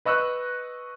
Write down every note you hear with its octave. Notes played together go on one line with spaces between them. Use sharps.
B4 D#5 C#6 E6 F#6